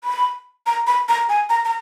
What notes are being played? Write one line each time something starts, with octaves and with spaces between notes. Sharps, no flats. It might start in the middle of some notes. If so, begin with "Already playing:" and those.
B5
A#5
B5
A#5
G#5
A#5
A#5